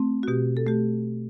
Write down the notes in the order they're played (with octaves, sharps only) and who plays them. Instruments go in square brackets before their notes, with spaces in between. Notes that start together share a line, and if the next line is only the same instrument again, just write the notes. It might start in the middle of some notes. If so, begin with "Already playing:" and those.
Already playing: [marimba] A3 C4
F#4
B2 G4
A4
A3 G4